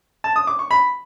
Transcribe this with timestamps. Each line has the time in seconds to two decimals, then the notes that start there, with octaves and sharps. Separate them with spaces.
0.24 A5
0.36 D#6
0.47 D6
0.59 C#6
0.71 B5